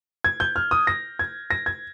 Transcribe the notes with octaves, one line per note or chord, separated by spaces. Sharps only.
G#6
G6
F6
D#6
A#6
G#6
A#6
G#6